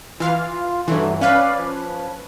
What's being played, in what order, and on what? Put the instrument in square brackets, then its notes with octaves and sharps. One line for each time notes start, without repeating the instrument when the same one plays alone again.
[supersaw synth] E3 F5 [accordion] F4
[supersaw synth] G2 E3 [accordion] F#3 A3
[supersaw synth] C#4 B4 [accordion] D5 F5
[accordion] F3